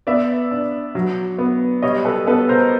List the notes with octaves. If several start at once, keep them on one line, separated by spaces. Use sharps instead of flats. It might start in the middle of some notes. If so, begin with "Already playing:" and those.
B3 D5 E5
D4
F#3
B3
G3 C#5 D#5
A4 B4
B3 A4 B4
A#4 C5